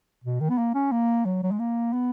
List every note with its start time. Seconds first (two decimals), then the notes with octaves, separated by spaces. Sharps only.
0.24 B2
0.41 D#3
0.50 B3
0.58 A#3
0.74 C#4
0.92 A#3
1.25 F#3
1.44 F#3
1.52 G#3
1.59 A#3
1.93 B3